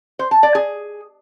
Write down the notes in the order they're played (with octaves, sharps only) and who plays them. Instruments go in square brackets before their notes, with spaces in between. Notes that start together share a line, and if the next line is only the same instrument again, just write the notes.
[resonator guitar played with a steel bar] C5
A5
D5
G#4